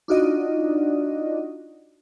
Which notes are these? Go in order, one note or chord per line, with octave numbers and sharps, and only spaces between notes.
D4 D#4 F4 F#4 D5 D#5